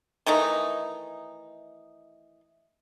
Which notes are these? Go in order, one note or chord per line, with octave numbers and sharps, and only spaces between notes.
D#3 E3 A3 D#4